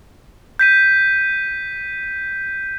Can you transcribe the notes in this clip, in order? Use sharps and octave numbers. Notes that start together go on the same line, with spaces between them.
G6 B6 D#7